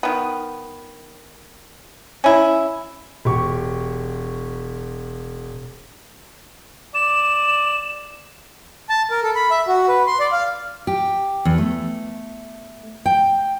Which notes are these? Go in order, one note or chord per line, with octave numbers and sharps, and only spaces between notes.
D#3 B3
C#4 E4
E1 G4 C#6
D5 E7
A5
A#4
A4
B5
E5
F#4
B4
C6
D5
F5
G4
E2
A3
G5